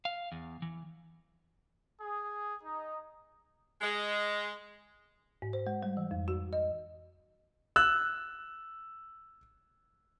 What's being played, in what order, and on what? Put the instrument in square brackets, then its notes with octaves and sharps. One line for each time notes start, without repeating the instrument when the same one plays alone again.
[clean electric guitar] F5
E2
E3
[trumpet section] G#4
D#4
[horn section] G#3
[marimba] G#2
C5
G#3
G3
E3
F2
F#4
D#5
[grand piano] E6 F#6